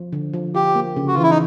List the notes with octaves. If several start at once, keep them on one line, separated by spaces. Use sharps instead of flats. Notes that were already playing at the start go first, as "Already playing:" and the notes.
Already playing: F3
D3
F3
F4 G4
A#3
C#3
F#4
F4
E3
E4
D#4